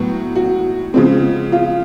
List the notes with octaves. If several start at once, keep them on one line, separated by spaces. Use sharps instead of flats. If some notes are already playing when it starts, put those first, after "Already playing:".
Already playing: A2 F#3 B3 F#4
F#4
C#3 F3 G#3 C4
F4